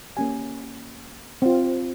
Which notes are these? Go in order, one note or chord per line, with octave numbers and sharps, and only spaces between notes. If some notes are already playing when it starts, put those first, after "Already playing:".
A#3 C#4 G4 G#5
C4 F4